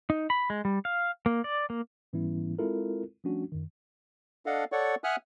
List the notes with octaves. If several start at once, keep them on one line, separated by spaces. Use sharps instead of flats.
D#4
B5
G#3
G3
F5
A#3
D5
A#3
G#2 E3 G3 B3 C#4 E4
G#3 C4 E4 F4 A4 A#4
F3 G3 A3 C#4 D4 F#4
F#2 D#3
D4 A4 D#5 F5 F#5
A4 C#5 D5 F#5 C#6
E5 F#5 G#5 D#6 F6 F#6